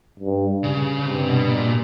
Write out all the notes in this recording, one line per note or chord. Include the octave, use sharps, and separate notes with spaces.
G2
C#3
G2 C3
B2
A#2